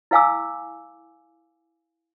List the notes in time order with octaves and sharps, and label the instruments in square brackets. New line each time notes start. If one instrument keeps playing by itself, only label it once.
[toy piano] E4 B4 F5 G#5 D6 E6